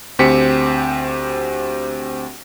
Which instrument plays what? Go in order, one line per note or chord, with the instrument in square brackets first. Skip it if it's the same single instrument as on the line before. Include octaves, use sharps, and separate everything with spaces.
[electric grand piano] D2 C4 G4 C5 B6 C#7